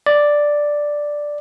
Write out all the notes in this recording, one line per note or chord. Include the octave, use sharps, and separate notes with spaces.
D5